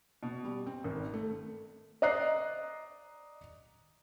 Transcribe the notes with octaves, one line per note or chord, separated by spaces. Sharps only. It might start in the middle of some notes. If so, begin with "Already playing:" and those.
B2
G3
C4
G#1
A3
D5 D#5 A#5 F#6 C7